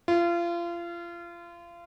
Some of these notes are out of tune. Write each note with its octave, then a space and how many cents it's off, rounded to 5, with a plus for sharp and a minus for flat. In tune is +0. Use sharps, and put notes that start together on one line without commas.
F4 -30